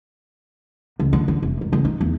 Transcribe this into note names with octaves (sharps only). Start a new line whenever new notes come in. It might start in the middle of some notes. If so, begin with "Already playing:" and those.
C#2
D3
D3
F1
G#2
C#2
D#4
E2